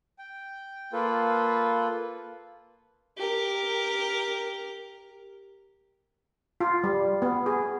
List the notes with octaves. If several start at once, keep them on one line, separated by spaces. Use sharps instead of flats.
G5
A#3 F4 A4 B4
G4 A#4
F4
G3
B3
G#4